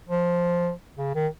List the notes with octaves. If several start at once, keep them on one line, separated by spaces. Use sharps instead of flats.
F3
C#3
D#3